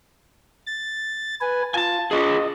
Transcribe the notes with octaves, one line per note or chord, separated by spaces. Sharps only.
A6
B4 G#5
F4 G#5 A5
F4 G#4 D#5